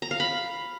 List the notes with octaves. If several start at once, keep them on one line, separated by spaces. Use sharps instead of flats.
A#5
F5
B5